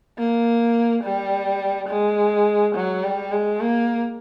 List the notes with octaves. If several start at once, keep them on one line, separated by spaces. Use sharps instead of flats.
A#3
G3
G#3
F#3
G3
G#3
A#3